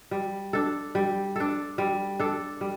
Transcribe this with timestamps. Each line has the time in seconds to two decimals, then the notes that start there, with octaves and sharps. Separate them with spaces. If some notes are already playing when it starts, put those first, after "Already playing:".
0.11 G3
0.53 D4 A4
0.95 G3
1.36 D4 A4
1.78 G3
2.19 D4 A4
2.61 G3